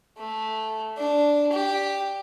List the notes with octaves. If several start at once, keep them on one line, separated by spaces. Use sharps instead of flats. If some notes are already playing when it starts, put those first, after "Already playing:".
A3
D4
G4